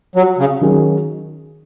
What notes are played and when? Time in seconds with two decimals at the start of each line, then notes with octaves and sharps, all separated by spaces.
0.16 F#3
0.39 C#3
0.61 D#3 F#3 C#4 G#4